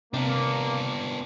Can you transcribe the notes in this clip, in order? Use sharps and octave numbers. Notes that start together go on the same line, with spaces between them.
C3 A#3 B3 D4